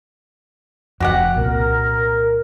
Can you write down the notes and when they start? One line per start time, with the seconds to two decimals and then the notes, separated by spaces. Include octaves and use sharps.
1.00 F1 F2 F#4 G4 F#5
1.36 C2 A#2 A#4